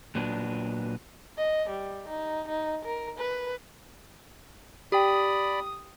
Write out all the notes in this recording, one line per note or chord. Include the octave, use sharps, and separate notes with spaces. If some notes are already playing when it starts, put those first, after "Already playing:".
A#2 F#3 B3 D4
D#5
G3
D#4
D#4
A#4
B4
G4 D5 G5 B5 D#6